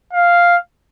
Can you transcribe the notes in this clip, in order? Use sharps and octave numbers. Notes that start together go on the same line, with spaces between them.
F5